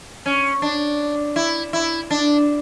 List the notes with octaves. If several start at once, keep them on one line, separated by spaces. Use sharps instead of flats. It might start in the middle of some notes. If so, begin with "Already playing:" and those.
C#4
D4
E4
E4
D4